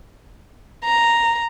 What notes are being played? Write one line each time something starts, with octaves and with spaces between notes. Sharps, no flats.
A#5